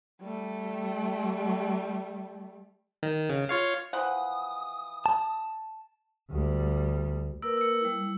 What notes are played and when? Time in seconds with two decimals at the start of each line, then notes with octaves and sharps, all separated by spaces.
0.22 G3 A3
3.03 D#3
3.30 C#3
3.49 F4 C#5 F5
3.93 E3 F3 F#5 D#6
5.06 A5
6.31 D2 G3
7.42 A#3 A#4 B4 E6
7.57 E6 C#7
7.81 G3 E4